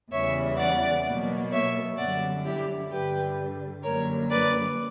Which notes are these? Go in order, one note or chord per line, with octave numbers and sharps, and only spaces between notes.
E2 C#3 E3 G3 C#5 E5
D5 F#5
B2 F#3 A#3
C#5 E5
F#2 D3 G3 D5 F#5
E4 G4
G2 D3 G3 G4 B4
F#2 D3 G3 A#3 A#4 C#5
B4 D5